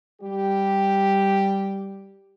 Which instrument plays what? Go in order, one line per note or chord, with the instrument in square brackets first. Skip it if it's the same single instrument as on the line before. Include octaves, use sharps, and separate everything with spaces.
[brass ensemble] G3 G4